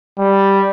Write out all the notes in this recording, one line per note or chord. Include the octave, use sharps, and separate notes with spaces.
G3